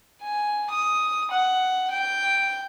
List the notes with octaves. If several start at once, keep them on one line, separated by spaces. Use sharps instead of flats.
G#5
D#6
F#5
G5